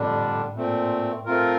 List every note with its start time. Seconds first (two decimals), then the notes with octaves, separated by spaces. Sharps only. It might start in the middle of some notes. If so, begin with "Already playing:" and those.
Already playing: F2 A2 D3 G3 D4
0.55 A#2 A3 C4
1.26 A3 C4 F4 A#4